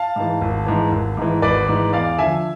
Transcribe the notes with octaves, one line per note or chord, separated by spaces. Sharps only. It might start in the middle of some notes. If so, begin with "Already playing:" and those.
Already playing: F5 A5
G#2 E3
G#1
G#2 E3
G#1
G#2 E3
G#1 B4 D5
G#2 E3
E2 D5 F5
D3 F3 E5 G#5